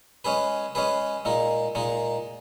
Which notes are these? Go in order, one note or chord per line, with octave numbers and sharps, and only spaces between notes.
G#3 C#4 G#4 B4
G#3 C#4 G#4 B4
A#2 G#3 D#4
A#2 G#3 D#4